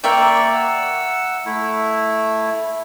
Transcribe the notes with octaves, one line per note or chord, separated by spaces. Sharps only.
A#3 A#4 D5 E5 G5 C#6
F#5 E6
A3 E4